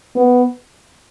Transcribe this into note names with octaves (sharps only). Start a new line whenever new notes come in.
B3